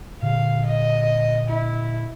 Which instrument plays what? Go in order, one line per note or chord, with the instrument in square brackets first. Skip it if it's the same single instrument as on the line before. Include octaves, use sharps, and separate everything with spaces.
[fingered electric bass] A#2 D3 [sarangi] F5
[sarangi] D#5
E4